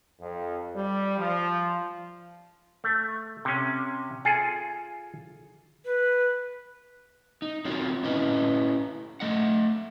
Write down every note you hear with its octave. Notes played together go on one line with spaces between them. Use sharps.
F2
G3
F3
A3
C3 C#4
F4 G#4 A4 G#5
B4
D#4
C4 F4 F#4 C#5
C#4 E4 B4 D#5
A3 D#5 F#5